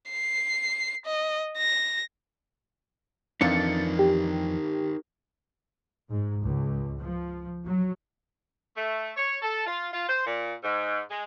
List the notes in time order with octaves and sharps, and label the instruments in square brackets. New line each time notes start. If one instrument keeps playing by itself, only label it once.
[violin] C7
D#5
A#6
[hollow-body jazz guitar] F2 E3 D4 [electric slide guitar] D#4 A#4 C5 [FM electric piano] A6 C#7
[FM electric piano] G4
[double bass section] G#2
C#2
F3
F#3
[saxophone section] A3
C#5
A4
F4
F4
C5
A#2
G#2
G#3